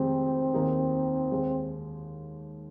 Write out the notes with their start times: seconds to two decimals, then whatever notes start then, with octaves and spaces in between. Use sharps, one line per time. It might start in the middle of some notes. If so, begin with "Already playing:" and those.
Already playing: F1 F2 D#3 G#3 C4
0.53 D#2 D#3 A#3 D#4 G#4
1.31 D#2 D#3 G#3